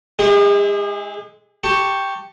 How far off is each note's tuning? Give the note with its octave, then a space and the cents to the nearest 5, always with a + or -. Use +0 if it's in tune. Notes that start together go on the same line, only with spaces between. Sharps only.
G#3 +0 E4 -40 G#4 -45
G4 +0 A5 +25 C#6 +0